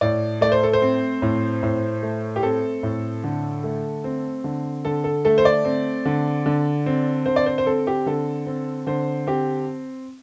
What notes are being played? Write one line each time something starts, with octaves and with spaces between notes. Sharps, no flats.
A2 D5
A3 D5
C5
A4
C5
C4
A2
A2
A3
G4
C4 A4
A2
D3
A3
C4
D3
D3 A4
A4
A3 A4
C5
D5
C4
D3
D3
C4
D3 C5
D5
C5
C5
C4 A4
G4
D3 A4
C4
D3 C5
C4 G4